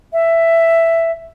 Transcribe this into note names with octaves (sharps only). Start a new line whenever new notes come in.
E5